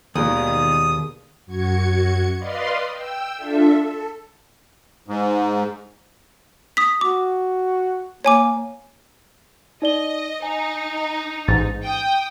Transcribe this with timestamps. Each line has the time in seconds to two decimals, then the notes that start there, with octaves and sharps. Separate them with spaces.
0.16 D#2 B2 D#3 G#3 F4 D5 D#6
1.46 F#2 F#4 G#6 C#7
2.39 B4 D5 D#5 F5 C6
2.91 G5 E6
3.36 D4 F4 A4 E5
3.78 A4
5.08 G#2
6.77 D#6 B6
7.01 F#4 D6
8.25 A#3 C#5 G#5 D6
9.82 D#4 D5 D#5 G7
10.42 D#4 G#5
11.48 A1 G#2 A6
11.82 G5 D#6